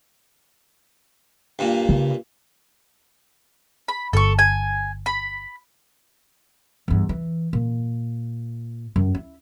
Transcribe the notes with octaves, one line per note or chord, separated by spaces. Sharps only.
G2 A#2
C#3
B5
G1 A4 C#6
G#5
B5
E2 G2
E3
A#2
F#2
E4